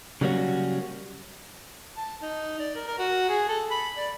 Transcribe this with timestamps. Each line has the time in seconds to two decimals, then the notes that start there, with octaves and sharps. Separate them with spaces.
0.21 C#3 F#3 G3 A#3 C#4 F#4
1.97 A5
2.22 D#4
2.60 D5
2.75 A#4
2.87 A#4
2.99 F#4
3.29 G#4
3.49 A4
3.71 B5
3.97 D5